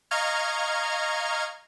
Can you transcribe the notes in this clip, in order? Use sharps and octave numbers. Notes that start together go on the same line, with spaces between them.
D#5 F5 A#5 C#6 F6 G#6